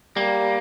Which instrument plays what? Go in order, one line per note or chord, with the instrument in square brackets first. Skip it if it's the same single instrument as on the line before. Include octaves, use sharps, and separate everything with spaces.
[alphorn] G3 [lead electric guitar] A#3